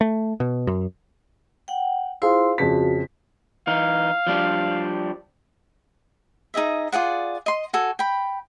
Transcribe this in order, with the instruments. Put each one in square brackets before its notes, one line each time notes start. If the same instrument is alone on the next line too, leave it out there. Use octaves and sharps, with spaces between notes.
[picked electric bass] A3
B2
F#2
[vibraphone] F#5 G5
[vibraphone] E4 C5 C6 [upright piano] F4 G#4 F5
[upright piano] F2 C#3 B6 [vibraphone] F#4
[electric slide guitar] E3 D#4 [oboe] F5
[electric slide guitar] F3 G3 D4
[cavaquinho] D#4 G#4 D#5 E5
F4 G#4 D5 F#5
D#5 C6
F#4 A4 G#5
G5 B5